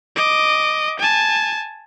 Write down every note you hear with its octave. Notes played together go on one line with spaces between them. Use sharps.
D#5 D6
G#5 A5